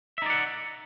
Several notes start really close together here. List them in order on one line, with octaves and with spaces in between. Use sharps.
E5 D#4 D5 F#5